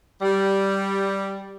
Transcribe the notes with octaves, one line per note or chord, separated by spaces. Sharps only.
G3